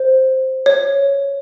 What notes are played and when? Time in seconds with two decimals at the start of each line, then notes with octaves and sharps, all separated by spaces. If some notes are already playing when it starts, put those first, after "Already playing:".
Already playing: C5
0.66 C#5